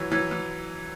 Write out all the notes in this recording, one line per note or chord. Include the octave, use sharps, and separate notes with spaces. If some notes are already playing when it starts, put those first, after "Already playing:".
Already playing: E3 F#3
E3 F#3
E3